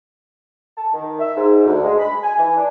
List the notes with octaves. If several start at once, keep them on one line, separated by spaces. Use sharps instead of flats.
A5
D#3
E5
G#2
D2
G#3
B5
G#5
E3
D4